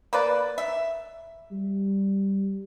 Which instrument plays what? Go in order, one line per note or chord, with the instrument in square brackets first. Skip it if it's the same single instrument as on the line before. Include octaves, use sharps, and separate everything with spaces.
[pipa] A#3 B4 D5
E5
[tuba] G3